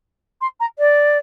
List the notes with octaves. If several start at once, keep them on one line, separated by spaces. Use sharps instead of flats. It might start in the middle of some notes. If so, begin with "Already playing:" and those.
C6
A#5
D5